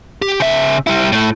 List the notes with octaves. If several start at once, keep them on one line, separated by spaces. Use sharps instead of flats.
G4
C#3 E5
G3 E4
A2 A3